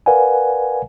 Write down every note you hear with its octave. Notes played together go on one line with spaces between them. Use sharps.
A#4 B4 D5 F5 F#5 G#5